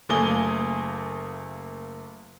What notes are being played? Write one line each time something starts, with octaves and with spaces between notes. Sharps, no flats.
F#1 A3 A#3 G#5 D#6 G7